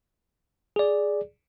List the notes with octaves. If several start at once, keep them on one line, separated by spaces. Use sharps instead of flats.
G#4 D5